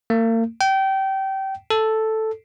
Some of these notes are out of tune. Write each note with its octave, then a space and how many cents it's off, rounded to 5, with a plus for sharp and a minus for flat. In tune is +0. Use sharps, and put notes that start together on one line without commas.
A#3 -40
G5 -25
A4 +0